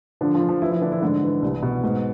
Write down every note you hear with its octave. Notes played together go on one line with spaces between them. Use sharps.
D3 F3 D4
F3 F4
D3
F3 F4
E3 F3 E4
E3 E4
D3 D4
E3 E4
G#2 D3 D4
E3
C2
B2
G#2